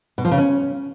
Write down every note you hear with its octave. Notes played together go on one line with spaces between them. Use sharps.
B2
F3
C#3
C#4